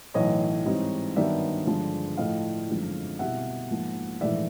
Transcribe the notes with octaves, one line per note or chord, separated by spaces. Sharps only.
B1 A2 E3 C#5 D#5
G#2 E3 G3 C4 D#4
G2 D#3 F#3 B3 D4 D5 E5
G1 G2 D3 F3 G#3
A2 F3 A3 D#5 F5
G#1 F#2 D3 F3 G#3
C2 B2 G3 B3 E5 F#5
G#2 F3 A#3
A#1 G#2 E3 A3 D5 E5